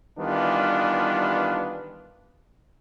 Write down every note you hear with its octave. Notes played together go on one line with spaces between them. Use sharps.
D#3 E3 G3 B3 D4 F4